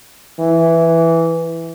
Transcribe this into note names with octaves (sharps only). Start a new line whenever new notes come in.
E3